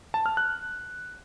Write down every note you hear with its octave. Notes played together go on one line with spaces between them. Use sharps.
A5
F6
F#6